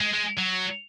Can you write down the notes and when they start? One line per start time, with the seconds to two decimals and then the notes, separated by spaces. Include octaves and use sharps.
0.01 G#3
0.13 G#3
0.38 F#3